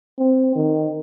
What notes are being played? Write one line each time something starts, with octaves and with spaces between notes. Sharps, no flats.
C4
D#3